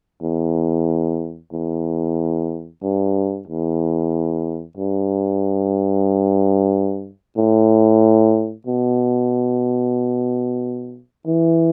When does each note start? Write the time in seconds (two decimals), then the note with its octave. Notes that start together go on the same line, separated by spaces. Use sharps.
0.22 E2
1.53 E2
2.83 G2
3.48 E2
4.77 G2
7.37 A2
8.67 B2
11.26 E3